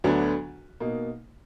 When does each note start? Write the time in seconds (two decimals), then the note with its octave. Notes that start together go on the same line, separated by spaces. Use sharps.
0.04 D2 D3 F#3 B3 D4
0.80 B2 A#3 D#4